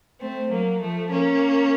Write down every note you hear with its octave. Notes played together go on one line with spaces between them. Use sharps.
A3 C4
F#3 A#3
F3 A3
A#3 C#4